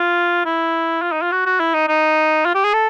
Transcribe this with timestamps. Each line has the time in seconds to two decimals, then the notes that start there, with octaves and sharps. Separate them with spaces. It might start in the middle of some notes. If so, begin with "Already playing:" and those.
Already playing: F4
0.46 E4
1.02 F4
1.12 D#4
1.22 F4
1.32 F#4
1.46 F#4
1.60 E4
1.74 D#4
1.88 D#4
2.46 F4
2.55 G4
2.65 G#4
2.74 A4